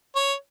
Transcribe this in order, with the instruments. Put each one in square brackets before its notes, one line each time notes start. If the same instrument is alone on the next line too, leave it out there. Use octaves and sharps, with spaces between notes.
[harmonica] C#5